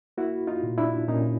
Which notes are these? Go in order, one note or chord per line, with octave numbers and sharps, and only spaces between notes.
A#3 E4 F#4
D#4 F4
A#2
D4 E4
A#2 C#4 D#4